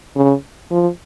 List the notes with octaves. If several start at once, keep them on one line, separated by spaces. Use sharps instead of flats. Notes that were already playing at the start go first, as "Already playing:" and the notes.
C#3
F3